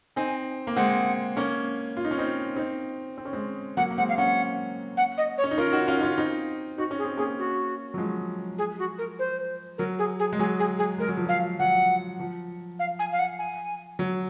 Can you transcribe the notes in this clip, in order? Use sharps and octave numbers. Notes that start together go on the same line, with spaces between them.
C4 D#4 G#5
A#3
G#3 C4 F#5
A#3 C#4
F4
D#4
C#4
C4 D#4
C4 D#4
C4
C#4
G#3 C4
F#3 A#3 F#5
A#3
G#3 C4 F#5
F5
A#3 C#4 F#5
F#5
D#5
C#5
C#4
D#4
C#4 F4 A#4
D#4 F#4
C#4 F4
D#4
C#4 F4
C4 D#4
D#4 F#4
C#4
G#4
C4
A#3 C#4 G#4
F#4
F#3
F3 G#3
G#4
F#4
A#4
C5
F#3 A#4
G#4
G#4
G#3
F#3 G#4
G#4
G#4
G#3 A#4
F#3
F3
F#3 F5
F#3 F#5
F3
F5
G#5
F5
F#5
G#5
F#3